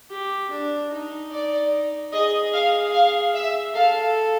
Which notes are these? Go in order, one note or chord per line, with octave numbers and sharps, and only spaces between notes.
G4
D4
D#4
D5
G#4 D#5
F5
F5
E5
A4 F5